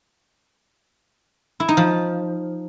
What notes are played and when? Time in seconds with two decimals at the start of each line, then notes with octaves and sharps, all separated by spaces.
1.60 E4
1.68 D#4
1.77 F3